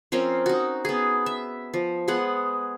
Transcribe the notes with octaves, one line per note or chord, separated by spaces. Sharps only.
F3 C4 C#4 A#4
D#4 F#4
B3 G#4
E5
F3
G#3 B3 G#4 F#5